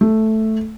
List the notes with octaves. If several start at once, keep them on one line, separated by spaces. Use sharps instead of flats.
A3